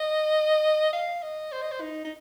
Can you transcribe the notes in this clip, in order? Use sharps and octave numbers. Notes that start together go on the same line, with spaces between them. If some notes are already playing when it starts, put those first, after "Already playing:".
Already playing: D#5
F5
D#5
C5
D#5
C5
D#4
D#4